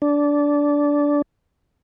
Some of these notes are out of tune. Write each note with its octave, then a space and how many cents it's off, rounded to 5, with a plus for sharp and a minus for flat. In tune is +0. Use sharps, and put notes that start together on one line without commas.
D4 -15